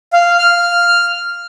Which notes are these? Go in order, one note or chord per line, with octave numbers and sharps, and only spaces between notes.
F5
F6